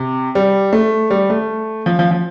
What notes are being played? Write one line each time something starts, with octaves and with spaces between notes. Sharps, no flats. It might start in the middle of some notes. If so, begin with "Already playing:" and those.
Already playing: C3
G3
A3
G3
A3
F3
F3
F3